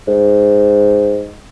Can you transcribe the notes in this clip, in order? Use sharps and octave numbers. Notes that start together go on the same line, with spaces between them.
G#2